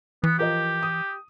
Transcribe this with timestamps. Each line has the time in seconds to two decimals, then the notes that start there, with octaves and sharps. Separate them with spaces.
0.24 E3 B3
0.39 F3 G4 A#4 D#5
0.83 D#6